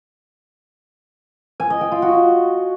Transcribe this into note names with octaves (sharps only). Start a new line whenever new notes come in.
G#5
D#5
G5
F4
F#4